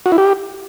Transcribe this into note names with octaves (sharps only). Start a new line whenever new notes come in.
F#4
E4
G4